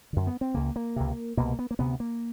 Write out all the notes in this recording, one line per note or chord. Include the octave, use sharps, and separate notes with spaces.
F#2 D3
B3
C4
C#2 C#3 A#3
A#3
C#2 C3
C2 B2 A#3
B3
A#3
D2 C3 B3
A#3